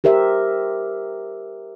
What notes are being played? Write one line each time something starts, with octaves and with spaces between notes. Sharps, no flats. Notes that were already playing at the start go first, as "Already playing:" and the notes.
G4 A#4 C5 E5